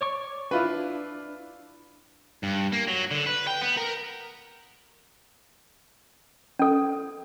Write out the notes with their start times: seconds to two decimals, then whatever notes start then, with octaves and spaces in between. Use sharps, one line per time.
0.01 C#5 D5 C#6
0.51 D4 E4 F4 B4
2.43 G2
2.72 A#3
2.87 F#3
3.11 D3
3.26 B4
3.47 G5
3.61 B3
3.77 A#4
6.59 C#4 A4